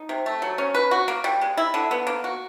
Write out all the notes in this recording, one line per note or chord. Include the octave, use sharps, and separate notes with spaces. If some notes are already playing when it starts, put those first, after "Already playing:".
Already playing: D#4
C3
A3
F#3
C#4
B4
F#4
A#3
G3
G#3
E4
D3
B3
A#3
F#4